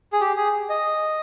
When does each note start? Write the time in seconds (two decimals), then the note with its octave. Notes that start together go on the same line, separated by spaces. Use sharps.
0.13 G#4
0.21 G4
0.37 G#4
0.70 D#5